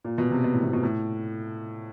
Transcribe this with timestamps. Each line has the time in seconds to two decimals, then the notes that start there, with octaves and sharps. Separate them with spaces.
0.04 A#2
0.18 B2
0.31 C3
0.44 B2
0.53 A2
0.63 B2
0.73 B2
0.83 A2